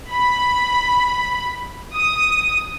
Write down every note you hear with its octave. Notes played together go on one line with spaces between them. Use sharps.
B5
D#6